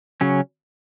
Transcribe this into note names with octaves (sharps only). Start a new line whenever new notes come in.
C#3 F#3 C#4